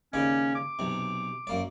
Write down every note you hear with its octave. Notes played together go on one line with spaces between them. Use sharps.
D#2 C#3 C#4 D5
D6
B1 C3
F#2 A#3 D5